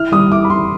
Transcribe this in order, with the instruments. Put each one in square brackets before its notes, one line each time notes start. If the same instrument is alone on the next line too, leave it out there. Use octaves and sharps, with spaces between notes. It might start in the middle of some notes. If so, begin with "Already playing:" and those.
Already playing: [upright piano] E4 [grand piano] F6
[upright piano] G3 [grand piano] D#6
[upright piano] E4 [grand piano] D6
[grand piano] B5
[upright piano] E4 [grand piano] C6